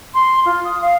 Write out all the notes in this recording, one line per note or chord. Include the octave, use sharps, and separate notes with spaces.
C6
F4
D#6
F5